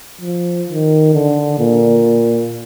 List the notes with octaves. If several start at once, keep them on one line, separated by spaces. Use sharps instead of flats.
F3
D#3
D3
A#2